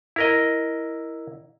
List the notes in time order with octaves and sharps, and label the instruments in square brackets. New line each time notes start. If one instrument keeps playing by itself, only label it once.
[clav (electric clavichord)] E4 A#4 D#5